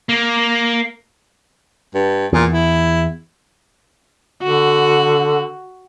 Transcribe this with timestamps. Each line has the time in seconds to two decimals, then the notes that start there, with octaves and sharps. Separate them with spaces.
0.09 A#3
1.95 G2
2.33 E2 A#2
2.53 E4
4.43 D3 F#4